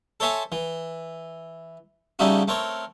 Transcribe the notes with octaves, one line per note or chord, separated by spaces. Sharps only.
A4 C5 C#5 E5 G#5 A5
E3
C#3 G3 A3 D#4 E4 F#4
A3 C4 A#4 C#5